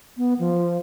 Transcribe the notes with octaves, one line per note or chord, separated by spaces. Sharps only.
B3
F3